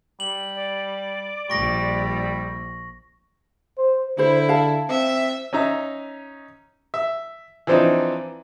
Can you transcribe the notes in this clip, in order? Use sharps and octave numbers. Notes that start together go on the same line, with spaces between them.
G3 F#7
D5
A#1 G3 C#6 A#6
C5
D3 E4 C5 B5
F5 A5
C4 E5
C#4 D#4 E5 A#5
E5
E3 F3 C4 D4 D#4